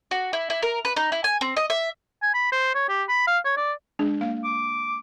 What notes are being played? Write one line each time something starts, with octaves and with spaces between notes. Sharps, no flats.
F#4
E4
E4
A#4
B4
D#4
E4
G#5
C4
D#5
E5
G#5
B5
C5
C#5
G4
B5
F5
C#5
D5
G#3 D4 G#4
A#3 F5
D6